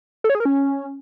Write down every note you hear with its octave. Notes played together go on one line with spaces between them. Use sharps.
A4
C#5
G#4
A#4
C#4